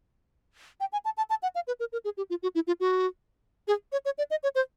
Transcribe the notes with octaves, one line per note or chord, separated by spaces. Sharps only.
G5
G#5
A5
A5
A5
F#5
F5
B4
A#4
A#4
G#4
G4
F4
F#4
E4
F4
F#4
G#4
C#5
C#5
D5
D#5
C#5
C5